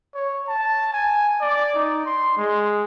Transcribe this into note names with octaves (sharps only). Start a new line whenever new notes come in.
C#5
A5
G#5
D5
D#4
C6
G#3